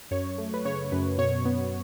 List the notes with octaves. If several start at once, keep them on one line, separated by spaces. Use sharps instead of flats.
F#2 C#5
A3
B4
C#3 C#5
F#2 B4
B2 C#5
B3